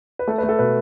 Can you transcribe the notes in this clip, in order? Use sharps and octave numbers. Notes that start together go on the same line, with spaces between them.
B4
A3 A4
B4
A3
A4
B2 B4